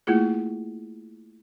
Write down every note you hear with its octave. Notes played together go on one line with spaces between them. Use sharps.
A3 A#3 E4 F4 G#4